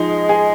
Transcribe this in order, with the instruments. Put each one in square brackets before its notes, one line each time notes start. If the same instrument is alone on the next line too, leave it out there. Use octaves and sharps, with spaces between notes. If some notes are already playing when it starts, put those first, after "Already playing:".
Already playing: [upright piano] F3 D#4 [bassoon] G#3
[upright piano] G#4